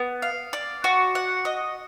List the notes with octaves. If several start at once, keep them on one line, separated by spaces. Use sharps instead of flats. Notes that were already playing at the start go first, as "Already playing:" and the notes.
Already playing: B3
F5
D5
F#4
F#5
D#5